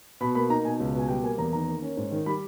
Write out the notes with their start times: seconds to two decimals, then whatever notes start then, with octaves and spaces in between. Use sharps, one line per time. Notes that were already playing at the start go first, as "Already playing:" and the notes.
0.21 B2 B5
0.35 A#3 B5
0.50 D#4 A#5
0.64 B2 G#5
0.80 C#2
0.94 B2
0.99 G#5
1.08 G3 G5
1.23 A#3 G#5
1.38 E2 A#5
1.53 D#3 A#5
1.68 A#3
1.82 C#4
1.97 G#2
2.11 D#3
2.26 G3 B5